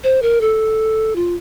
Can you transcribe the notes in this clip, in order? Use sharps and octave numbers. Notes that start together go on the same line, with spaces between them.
C5
A#4
A4
F4